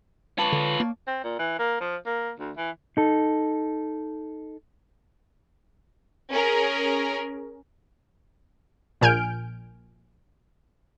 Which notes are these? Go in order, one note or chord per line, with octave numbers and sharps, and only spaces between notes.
F4 B4 C#5 D5 A5
D3
A#3
C4
A#2
E3
A#3
F3
A#3
D2
E3
D#4 A4
C#4 G#4 A#4
A#1 A#2 G#5 F6 G6 D7